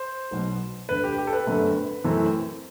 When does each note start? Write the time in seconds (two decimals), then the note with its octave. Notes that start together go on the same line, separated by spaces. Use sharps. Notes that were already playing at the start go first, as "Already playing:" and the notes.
Already playing: C5
0.31 B1 B2 F#3 B3
0.89 E1 D2 D3 B4
1.04 G4
1.18 G4
1.27 A4
1.33 B4
1.47 G1 F#2 D3 A3 C4
2.04 F#2 E3 A3 C4